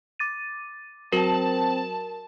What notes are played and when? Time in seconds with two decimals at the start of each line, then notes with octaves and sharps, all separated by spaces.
0.19 D6 A6 D#7
1.12 F#3 C4 F#4 A#4 A5 F#7